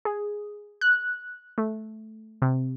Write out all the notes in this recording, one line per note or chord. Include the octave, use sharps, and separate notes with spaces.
G#4
F#6
A3
C3